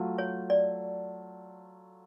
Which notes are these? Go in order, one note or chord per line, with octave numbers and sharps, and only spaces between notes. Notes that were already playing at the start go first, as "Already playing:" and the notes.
Already playing: F#3 A3 F4
C#5
D5